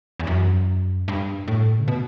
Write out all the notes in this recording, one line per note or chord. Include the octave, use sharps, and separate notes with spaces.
E2
F#2
G2
A2
C#3
B2